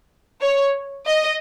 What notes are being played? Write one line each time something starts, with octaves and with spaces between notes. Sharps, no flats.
C#5
D#5